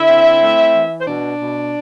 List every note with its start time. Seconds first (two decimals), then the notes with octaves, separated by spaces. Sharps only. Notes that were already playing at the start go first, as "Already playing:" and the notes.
Already playing: D3 E4 E5
0.09 C4
0.42 A3
0.74 E3
1.01 C5
1.06 B2 D4 D5
1.39 B2